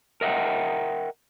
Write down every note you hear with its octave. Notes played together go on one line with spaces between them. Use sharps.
A#4 D#5 E5 F#5 G5